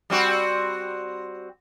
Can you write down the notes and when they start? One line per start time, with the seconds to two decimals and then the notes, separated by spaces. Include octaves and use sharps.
0.10 G3 C4 F#4